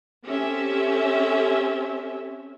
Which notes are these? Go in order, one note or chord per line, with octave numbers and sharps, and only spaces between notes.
C4 C#4 G4 A4 E5